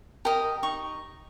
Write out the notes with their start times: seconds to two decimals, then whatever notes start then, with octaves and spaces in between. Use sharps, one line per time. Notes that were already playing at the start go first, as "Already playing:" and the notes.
0.25 G4 A#4 D#5
0.63 D#4 C#6